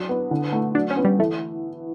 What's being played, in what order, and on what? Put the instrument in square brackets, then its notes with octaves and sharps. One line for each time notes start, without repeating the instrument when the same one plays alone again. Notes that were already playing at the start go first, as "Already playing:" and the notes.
Already playing: [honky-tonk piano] F#3 D4
B3
D3
A3
[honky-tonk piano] F#3 [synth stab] D4
[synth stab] C#4
[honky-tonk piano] B3
[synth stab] G3
[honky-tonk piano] E3 [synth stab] A3